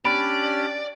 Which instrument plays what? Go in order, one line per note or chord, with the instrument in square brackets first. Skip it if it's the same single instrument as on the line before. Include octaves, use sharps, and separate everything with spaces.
[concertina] C#4 D4 G4 [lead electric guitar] D5 [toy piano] B5 [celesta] D7